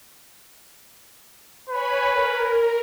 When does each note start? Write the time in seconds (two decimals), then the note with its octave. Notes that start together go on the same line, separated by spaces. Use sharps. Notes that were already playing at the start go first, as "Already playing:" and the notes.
1.70 B4 C#5 G#5 B5
2.11 A#4